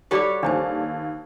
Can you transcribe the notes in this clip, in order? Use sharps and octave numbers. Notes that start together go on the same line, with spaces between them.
G3 F#4 G4 A4 C#5 D5 D6
D#2 D4 C5 G#5 A5